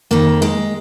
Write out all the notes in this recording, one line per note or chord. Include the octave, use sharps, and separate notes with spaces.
F2 D#3 A#3
G#3